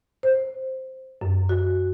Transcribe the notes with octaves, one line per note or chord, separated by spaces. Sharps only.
C5
F#2
F#4